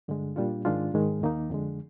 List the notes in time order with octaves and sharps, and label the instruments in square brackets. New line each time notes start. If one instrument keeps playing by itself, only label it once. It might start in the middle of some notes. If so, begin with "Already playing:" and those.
[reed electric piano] G2 D3 G#3
A#2 G3 D4 F4
G#2 D#3 G#3 D4 F4
G#2 D#3 G#3
D#2 D#3 A#3 D#4
F2 D3 G#3